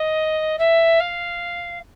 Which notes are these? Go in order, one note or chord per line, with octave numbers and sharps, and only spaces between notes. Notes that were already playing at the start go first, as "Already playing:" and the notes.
Already playing: D#5
E5
F5